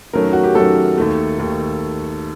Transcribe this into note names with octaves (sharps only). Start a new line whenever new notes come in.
F#2 D#3 F#3 A3 A#4
F#4
G4
F#2 D#3 F#3 A3 A4
D#2 D#3 A3
D#2 D#3 A3